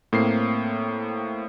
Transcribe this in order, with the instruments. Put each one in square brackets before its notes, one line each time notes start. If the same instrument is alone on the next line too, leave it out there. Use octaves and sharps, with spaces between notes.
[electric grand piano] A2 A#3 C4 C7